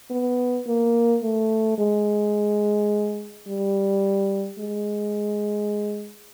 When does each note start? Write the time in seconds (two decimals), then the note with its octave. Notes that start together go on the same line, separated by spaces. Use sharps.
0.10 B3
0.67 A#3
1.23 A3
1.78 G#3
3.48 G3
4.59 G#3